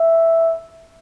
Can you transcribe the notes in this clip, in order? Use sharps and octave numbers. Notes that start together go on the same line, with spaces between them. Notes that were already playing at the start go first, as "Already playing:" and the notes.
Already playing: E5